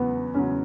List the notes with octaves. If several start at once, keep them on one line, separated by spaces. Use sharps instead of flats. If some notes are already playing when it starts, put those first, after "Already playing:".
Already playing: E2 C#3 F#3 B3
E2 C#3 F#3 C#4